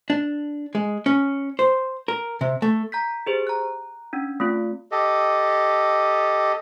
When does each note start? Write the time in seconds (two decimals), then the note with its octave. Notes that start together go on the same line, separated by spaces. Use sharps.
0.10 D4
0.75 G#3
1.06 C#4
1.59 C5
2.08 A#4
2.41 C3
2.62 A3
2.92 A#5 G6 B6
3.26 G4 G#4 C5
3.47 A#5 F#6
4.13 C#4 D4
4.40 A3 C4 F4
4.92 G4 A4 D#5